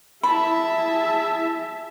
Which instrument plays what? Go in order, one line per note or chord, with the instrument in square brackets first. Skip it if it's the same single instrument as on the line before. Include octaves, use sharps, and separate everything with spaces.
[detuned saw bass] E4 [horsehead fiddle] G#4 A5 [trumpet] E5 [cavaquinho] B5